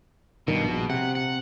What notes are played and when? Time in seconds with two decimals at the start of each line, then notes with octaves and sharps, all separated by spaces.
0.48 G2 B2 D#3
0.64 A#1
0.90 C3 F#5
1.15 F#5